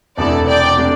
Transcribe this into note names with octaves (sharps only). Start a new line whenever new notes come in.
E1 E2 C3 A3 E4 A4 D5
D5 G5
C3 A3 D4